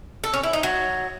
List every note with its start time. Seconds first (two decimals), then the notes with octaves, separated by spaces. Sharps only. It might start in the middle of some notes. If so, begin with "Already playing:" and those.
0.24 A4
0.33 C#4
0.43 E4
0.53 D#4
0.63 F#3